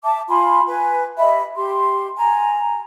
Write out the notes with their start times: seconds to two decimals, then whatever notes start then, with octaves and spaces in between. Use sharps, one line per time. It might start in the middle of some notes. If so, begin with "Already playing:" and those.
0.03 E5 A5 D6
0.29 F4 G#5 B5 C6
0.66 B4 G#5
1.18 G4 D#5 E5 B5
1.55 G4 C6
2.17 G#5 A#5